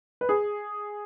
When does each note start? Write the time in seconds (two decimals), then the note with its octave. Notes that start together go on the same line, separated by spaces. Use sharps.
0.21 B4
0.29 G#4